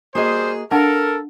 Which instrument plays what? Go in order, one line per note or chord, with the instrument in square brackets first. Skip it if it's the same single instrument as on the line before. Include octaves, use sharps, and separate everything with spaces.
[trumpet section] G3 C5 [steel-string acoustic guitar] A#3 F#4 D#5 [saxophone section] G#4
[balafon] D4 F#5 A5 [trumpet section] A4 [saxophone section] A#4 [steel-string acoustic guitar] F5